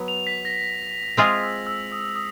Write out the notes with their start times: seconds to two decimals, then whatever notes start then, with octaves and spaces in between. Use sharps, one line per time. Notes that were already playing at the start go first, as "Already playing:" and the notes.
Already playing: F#3 B3
0.08 F7
0.27 B6
0.45 A#6
1.17 G#3 C4 F4 G#4
1.43 E6
1.67 E6
1.92 D#6
2.16 D#6